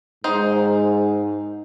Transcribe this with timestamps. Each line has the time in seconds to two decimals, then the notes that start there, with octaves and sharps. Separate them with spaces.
0.24 G#2 D#3 D#4 C5